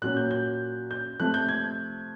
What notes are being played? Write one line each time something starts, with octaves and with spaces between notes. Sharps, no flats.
A#2 F#3 A#3 C#4 F#6
G6
G6
G6
C3 F3 A3 F#6
G6
G#6